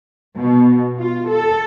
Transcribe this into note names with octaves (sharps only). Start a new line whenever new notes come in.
B2
F4
A4